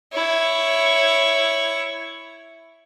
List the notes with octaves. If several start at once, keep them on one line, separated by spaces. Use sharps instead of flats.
E4 C#5